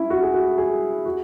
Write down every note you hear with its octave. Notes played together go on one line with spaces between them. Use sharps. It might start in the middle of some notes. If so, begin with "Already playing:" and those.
Already playing: C#4 E4
F#4
G#4
F#4
G#4
F#4